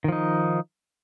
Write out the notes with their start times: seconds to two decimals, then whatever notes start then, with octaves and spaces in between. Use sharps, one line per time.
0.04 D#3
0.08 F3
0.12 D#4